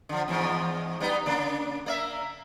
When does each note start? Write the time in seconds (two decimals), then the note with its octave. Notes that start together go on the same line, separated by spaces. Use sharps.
0.09 D3 F3
0.28 E2 G#2 F3
1.00 G3 B3 D#4
1.26 C#3 A#3 D4
1.86 A#3 D5 E5